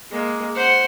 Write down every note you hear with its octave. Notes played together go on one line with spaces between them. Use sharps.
G#3 A#3
C5 F#5